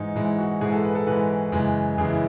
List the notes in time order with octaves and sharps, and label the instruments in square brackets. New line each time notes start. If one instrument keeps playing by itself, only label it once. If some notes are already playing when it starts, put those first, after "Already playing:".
Already playing: [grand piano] G#2 E3 G#3 D#4
G#2 E3 G#3 E4
F#4
G#2 E3 G#3 G#4
A4
B4
A4
G#2 E3 G#3 B4
F#2 C#3 E3 G#3
F#2 C#3 E3 G#3 G#4
E4